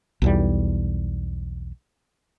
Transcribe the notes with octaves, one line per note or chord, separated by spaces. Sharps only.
B1 E2 G3